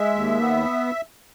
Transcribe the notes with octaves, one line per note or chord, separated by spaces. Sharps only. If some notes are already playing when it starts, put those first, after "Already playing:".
Already playing: G#3 E5
D#2
B3